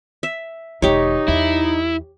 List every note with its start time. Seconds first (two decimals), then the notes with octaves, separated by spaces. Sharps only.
0.23 E5
0.82 E1 D#3 D#4 G4 C#5
1.28 E2 E4